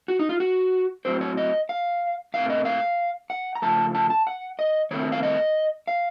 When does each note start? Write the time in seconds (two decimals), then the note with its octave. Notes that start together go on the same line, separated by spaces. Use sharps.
0.08 F#4
0.19 D#4
0.29 F4
0.40 F#4
1.05 A2 F#3 C4 C5
1.21 C#5
1.37 D#5
1.69 F5
2.34 A#2 A3 C4 F5
2.50 D#5
2.65 F5
3.30 F#5
3.55 A#5
3.62 C#3 F3 A3 A5
3.95 A5
4.10 A5
4.27 F#5
4.59 D#5
4.91 D#3 A3 C4 C#5
5.12 F5
5.23 D#5
5.87 F5